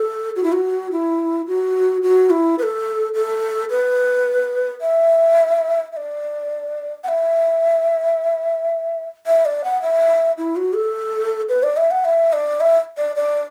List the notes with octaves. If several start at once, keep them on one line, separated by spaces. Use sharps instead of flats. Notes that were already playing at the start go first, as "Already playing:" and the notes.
Already playing: A4
F#4
E4
F#4
E4
F#4
F#4
E4
B4
A4
A4
B4
E5
E5
D5
F#5
E5
E5
D5
F#5
E5
E4
F#4
A4
B4
D5
E5
F#5
E5
D5
E5
D5
D5